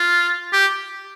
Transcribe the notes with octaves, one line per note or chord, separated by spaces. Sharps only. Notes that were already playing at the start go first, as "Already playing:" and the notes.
Already playing: F4
G4